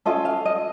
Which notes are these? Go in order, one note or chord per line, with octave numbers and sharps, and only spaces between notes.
C#4 F4 A4 D#5
F5
D#5